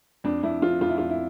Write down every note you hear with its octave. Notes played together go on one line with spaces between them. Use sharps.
F2 D4
F2 E4
F3 F4
F2 F4
E4
F2 F4
E4